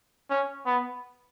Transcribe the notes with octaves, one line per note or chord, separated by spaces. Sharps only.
C#4
B3